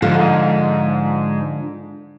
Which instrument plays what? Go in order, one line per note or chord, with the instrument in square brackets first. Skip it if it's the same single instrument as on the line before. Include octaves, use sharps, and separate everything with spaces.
[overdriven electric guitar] G#2 [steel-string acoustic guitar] D3 F3 F4